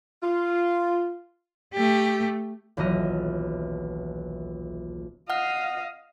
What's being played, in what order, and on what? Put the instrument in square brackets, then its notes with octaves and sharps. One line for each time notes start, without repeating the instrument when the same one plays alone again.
[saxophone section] F4
[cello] A3 G4
[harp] D#1 B1 E3 D#5 F6
[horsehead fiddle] D#5 F5 [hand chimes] F#5 F6